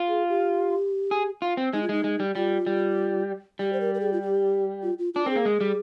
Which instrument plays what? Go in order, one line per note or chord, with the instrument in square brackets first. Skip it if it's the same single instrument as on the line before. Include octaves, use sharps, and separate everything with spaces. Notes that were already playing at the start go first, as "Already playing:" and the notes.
Already playing: [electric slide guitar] F4
[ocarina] G#4
G4
[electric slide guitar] G#4
F4
C4
[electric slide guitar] G#3 [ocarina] D#4
[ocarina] F4
[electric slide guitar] G#3 [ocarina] D#4
[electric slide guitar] G#3
G3
[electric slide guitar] G3 [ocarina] F4
[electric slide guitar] G3
[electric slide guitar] G3 [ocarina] G4
[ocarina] C5
A#4
A#4
G#4
F4
G4
F4
F4
[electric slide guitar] D4 [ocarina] F4
[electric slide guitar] C4 [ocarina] G#4 A#4
[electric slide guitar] A#3
G#3
G3